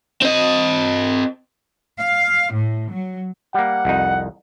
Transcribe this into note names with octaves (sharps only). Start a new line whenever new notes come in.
C4 D#5
F5
A2
F#3
G3 A#3 F#5
C2 F2 D#4